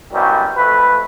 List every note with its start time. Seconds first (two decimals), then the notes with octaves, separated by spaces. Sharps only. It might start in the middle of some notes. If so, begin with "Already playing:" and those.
0.13 C2 F#2 B2 G3
0.56 F2 A3 B4